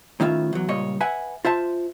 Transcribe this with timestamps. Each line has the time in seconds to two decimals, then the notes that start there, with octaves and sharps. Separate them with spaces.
0.20 A2 D#3 C#4 F4 E5
0.53 E2 F#3
0.68 C#2 A#2 G3 C#5 D#5
1.01 B4 E5 F#5 G#5
1.45 F4 C5 E5 A5